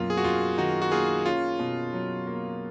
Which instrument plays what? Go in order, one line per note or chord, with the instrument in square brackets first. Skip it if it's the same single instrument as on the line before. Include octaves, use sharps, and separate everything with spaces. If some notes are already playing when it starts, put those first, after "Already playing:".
Already playing: [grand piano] F#2 B2 A#3 [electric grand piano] F4
[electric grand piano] G#4
F#4
[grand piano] F#2 [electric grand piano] F4
[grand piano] D#3 [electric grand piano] D#4 F#4
[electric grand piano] F#4
[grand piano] A#3 [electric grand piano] F4 G#4
[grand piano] C#4 [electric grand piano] F4
[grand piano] B2
F#3
A#3